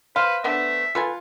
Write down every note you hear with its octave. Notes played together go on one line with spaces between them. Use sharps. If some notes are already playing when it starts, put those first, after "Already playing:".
B4 C5 F5
A3 B3 D4 E5
F4 A4 B4 G#5